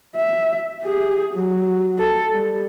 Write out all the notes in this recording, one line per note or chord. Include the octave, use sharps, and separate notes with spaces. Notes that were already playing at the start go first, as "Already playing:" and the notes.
E5
G4 G#4
F#3
A4
G3